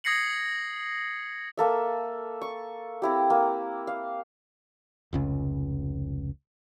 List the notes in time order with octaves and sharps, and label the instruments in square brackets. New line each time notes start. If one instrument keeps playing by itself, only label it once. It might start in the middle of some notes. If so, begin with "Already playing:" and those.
[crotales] D#6 G#6 A#6 C7 C#7 F#7
[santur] A#3 A4 E5
C#6
C4 E4 G4
A#3
F5
[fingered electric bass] F1 C#2 C#3